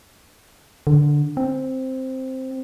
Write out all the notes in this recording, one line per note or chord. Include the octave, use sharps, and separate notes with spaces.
D3
C4